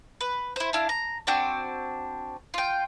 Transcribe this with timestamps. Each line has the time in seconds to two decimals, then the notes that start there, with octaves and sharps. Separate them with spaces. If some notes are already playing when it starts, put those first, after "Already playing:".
0.21 B4
0.56 E4 C5
0.73 D4 E4 F5
0.89 A#5
1.27 C4 D4 F#4 D5
2.54 F4 G5